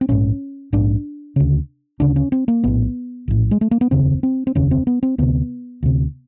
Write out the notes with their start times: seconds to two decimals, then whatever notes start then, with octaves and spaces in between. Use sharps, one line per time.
0.01 C4
0.09 A#1 G#2 C#4
0.73 A#1 G#2 D4
1.36 D2 C#3
2.00 D2 C#3 D4
2.16 C#4
2.32 C4
2.48 A#3
2.64 A#1 A2 B3
3.28 A#1 A2
3.51 G#3
3.61 A3
3.71 A#3
3.81 B3
3.91 F1 D#2 C#3 C4
4.23 C4
4.47 C4
4.55 F1 D#2 C#3 C#4
4.71 C4
4.87 B3
5.03 C4
5.18 D2 C3 B3
5.83 D2 C3